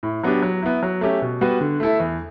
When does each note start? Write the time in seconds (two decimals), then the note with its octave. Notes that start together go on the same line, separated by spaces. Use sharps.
0.03 A2
0.23 F#3 B3 D4 G4
0.42 F#3
0.62 B3 E4
0.83 F#3
1.01 A3 C#4 G4
1.22 B2
1.41 G3 B3 F#4 B4
1.61 D3
1.80 A3 E4 A4
2.00 E2